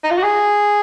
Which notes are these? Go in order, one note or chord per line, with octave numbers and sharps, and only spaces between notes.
D#4
F4
F#4
G#4